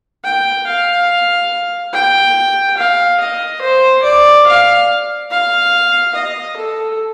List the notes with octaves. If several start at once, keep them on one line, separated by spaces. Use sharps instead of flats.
G5
F5
G5
F5
D#5
C5
D5
F5
F5
D#5
A4